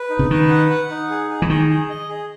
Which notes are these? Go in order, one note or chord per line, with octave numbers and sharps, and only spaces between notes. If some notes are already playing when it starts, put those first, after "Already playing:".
Already playing: B4
D#4
C#3
D#3 B4
F#5
F#5
D#4
G#4
G#4
E3
D#3 G#4
G#4
D#5
G#4